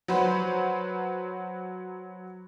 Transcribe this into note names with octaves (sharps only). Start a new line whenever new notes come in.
F#3 F#4 B4 C5